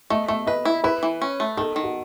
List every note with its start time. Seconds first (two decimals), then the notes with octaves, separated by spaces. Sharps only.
0.10 A3 D#5
0.28 A3 E5
0.47 B4 D#5
0.65 E4
0.84 E4 B4
1.03 E3
1.22 C#4
1.40 A3
1.57 D#3 A4
1.76 D#3
1.84 F#4